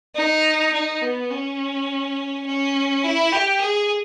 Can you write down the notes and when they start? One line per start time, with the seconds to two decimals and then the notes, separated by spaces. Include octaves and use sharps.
0.15 D#4
0.73 D#4
1.02 B3
1.30 C#4
2.46 C#4
3.04 E4
3.33 G4
3.61 G#4